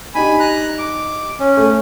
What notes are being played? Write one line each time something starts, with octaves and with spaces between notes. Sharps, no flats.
D4 D#4 G4 G#5 B5
A#5 F#6
D6
C#4
A3